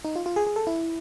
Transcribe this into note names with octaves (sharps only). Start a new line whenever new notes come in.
D#4
F4
F4
G#4
G#4
A4
E4